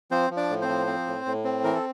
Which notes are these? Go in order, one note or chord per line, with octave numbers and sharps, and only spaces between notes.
F3 C4 C5
F3
D4 D5
A2
C4 C5
F3
C4
A2
A2
C4
E3 A#4
A4